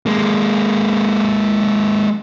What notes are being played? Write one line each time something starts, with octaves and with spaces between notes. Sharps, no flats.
G#3 A#3